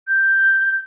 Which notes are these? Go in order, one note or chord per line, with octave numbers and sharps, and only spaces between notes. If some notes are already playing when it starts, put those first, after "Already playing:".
G6